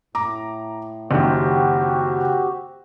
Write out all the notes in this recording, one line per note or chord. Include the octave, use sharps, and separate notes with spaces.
A2 A#5 D6
F#1 D#3 C4 F#4 G4